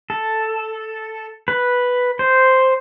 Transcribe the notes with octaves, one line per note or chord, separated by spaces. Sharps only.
A4
B4
C5